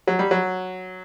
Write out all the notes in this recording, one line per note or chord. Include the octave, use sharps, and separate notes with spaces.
F#3
G3
F#3